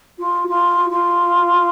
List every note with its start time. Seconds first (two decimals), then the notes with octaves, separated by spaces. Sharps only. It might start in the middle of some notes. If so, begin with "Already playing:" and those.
0.19 F4
0.48 F4
0.90 F4